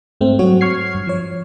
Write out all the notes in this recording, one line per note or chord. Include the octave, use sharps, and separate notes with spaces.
G#2 A3 C4
G2 F#3 F#4 C#5
C#6 F6 G#6 C7
G2
F3 C#5